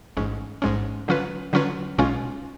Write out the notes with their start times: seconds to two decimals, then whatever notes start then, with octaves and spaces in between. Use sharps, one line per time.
0.17 A1 G#2 G#3 C#4
0.62 A1 G#2 G#3 C#4
1.08 D3 F#3 C#4 F4 B4
1.53 D3 F#3 C#4 F4 B4
1.98 B1 B2 G#3 C#4 F4